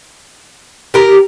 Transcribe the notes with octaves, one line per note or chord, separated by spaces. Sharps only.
G4 A#4